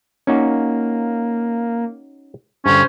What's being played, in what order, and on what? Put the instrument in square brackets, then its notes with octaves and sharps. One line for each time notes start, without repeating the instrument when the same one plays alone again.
[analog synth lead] A#3 [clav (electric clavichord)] C#4 D#4 F#4
[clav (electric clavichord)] G2 D3 [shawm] C#4 [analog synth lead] C5